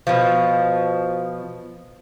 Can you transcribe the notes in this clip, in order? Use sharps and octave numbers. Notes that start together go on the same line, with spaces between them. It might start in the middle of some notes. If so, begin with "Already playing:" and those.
B2 F3